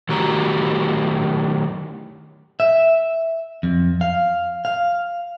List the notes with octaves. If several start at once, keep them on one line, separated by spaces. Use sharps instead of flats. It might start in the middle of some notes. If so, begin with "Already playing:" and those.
D#3 F#3 A3 F#4 G4 A#5
E5
F2
F5
F5